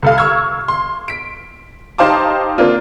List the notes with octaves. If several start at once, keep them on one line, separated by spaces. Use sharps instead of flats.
C2 A4 F5
C#6 E6 F6 G#6
C6
B6 D7
D#4 G4 C5 F5 A5 D6
A#3 C4 D4 F4